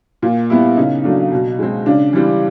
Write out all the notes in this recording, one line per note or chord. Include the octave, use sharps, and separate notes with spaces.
A#2
G3 B3 E4
C#3 D#4
F#3 A3 D4
B2
G#3 C4
C#3 D4
E3 G3 C4